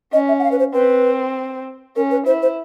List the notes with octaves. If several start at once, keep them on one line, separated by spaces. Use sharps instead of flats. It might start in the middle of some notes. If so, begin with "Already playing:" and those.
C#4 D#5
E5
F#5
F5
B4
C5
C4 B4
C#4 A#4
B4
E4 C5
C5